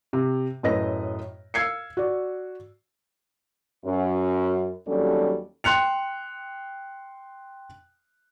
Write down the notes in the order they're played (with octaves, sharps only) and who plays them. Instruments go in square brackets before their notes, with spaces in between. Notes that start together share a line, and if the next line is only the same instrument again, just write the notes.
[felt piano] C3
F#2 A2 B4 D#5 A#6
F5 E6 G#6 C7 C#7
F#4 D5
[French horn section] F#2 C#4
D#2 F#3 G3 C#4 D4 A4
[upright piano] G5 C6 F#6 C#7 F7